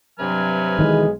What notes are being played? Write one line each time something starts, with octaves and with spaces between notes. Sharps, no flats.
G2 C3 F#3 B4 G#5 F6
B1 D#3 E3 G#3